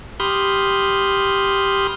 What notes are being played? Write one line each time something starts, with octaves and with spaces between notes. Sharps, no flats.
G4 B5 C6 D#6 F6